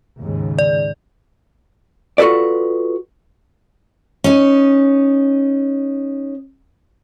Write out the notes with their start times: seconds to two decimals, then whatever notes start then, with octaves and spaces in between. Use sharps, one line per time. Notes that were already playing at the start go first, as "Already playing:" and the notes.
0.20 D#2 G#2 C#3
0.59 D5
2.18 F4 F#4 A4 B4 D5
4.24 C#4 D#4